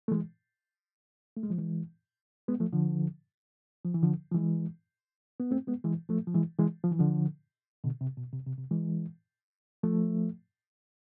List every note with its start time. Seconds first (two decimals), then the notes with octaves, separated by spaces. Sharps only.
0.08 A3
0.11 E3 G#3
1.37 A3
1.43 G#3
1.50 F3
1.58 E3 G#3
2.48 G#3 B3
2.60 F3 A3
2.73 D3 F3
3.85 F3
3.95 E3
4.03 D3 F3
4.31 F3
4.35 E3 G#3
5.40 B3
5.51 A3 C4
5.67 G#3 B3
5.84 E3 G#3
6.09 F3 A3
6.27 F3
6.34 E3 G#3
6.59 E3 G#3
6.84 F3
6.92 E3
6.99 D3 F3
7.84 B2 D3
8.01 C3
8.17 B2
8.33 C3
8.47 C3
8.58 C3
8.71 E3 G#3
9.83 F3 A3